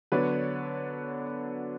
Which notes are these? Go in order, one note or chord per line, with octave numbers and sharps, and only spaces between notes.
D3 F#3 B3 D4 B4 C#5